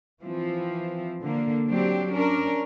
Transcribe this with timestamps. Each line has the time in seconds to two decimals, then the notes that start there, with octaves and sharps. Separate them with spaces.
0.22 E3 F3 C4
1.22 D3 A#3
1.67 F#3 C4 D4 G4
2.12 C#4 D4 A#4